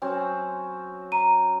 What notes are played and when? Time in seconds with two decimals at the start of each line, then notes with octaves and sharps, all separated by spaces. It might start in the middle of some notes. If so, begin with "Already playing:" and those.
0.02 F#3 C4 C#4
1.12 A#5 D#7